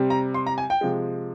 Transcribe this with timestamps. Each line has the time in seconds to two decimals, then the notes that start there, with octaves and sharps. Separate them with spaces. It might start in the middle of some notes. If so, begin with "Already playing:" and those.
Already playing: C3 G3 C4
0.10 A#5
0.34 C6
0.46 A#5
0.58 G#5
0.70 G5
0.81 C3 F3 G#3